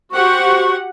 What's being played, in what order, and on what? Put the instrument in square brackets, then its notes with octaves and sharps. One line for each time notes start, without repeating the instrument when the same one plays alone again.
[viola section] F#4 G4 F#5 [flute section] C5 C#6